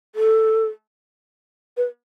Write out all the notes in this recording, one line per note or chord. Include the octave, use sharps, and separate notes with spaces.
A4
B4